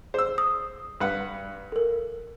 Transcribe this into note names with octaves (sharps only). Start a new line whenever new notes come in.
G#4 C5 E6
D#6
G2 B4 F#5
A4 A#4